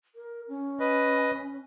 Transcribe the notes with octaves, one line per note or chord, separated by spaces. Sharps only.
A#4
C#4
B4 D#5